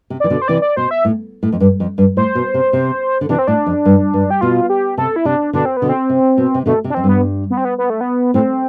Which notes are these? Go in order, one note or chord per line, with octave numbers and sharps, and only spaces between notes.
C3
E3 D5
B2 D3
C5
C3 E3 D5
D5
B2 C5
E5
A2
A2
F2
G2
F2
G2
A2 C5
B2
C3
C3
D3
C3 E3 D4
C4
A2 D4
F2
G2
G2
G4
B2 F4
G4
C3 A4
E4
C3 D4
B2 D3 D4
C4
B3
B2 D3
C4
C3
B2
C3
B2 D3 A3
C3
D4
F2 C4
G2 B3
B3
C4
B3
B3
A3
B3
A2 C4